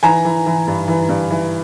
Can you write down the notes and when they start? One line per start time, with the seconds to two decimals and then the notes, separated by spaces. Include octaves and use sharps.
0.03 E3 G#5 A#5
0.25 E3
0.46 E3
0.67 G2
0.88 E3
1.09 G2
1.31 E3